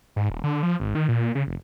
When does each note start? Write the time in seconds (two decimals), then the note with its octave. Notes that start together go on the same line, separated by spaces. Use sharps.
0.16 G#2
0.30 D#1
0.44 D3
0.63 F3
0.80 G#1
0.95 D#3
1.09 A#2
1.35 C#3
1.47 F1